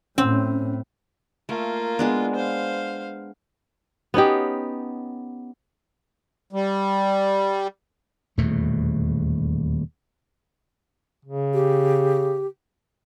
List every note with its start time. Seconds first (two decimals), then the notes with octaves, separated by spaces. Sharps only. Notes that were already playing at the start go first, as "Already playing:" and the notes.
0.18 A2 C4 C#4
1.49 A3 A#3 F4
1.99 G#3 B3 D4
2.35 C5 F5
4.14 B3 C#4 D#4 G4
6.53 G3
8.38 D#1 E2 B2 A3
11.25 C#3
11.54 G4